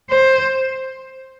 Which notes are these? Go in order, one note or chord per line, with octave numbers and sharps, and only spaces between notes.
C5